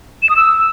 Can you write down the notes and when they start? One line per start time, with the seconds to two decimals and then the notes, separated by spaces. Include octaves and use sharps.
0.23 E7
0.29 D#6
0.36 E6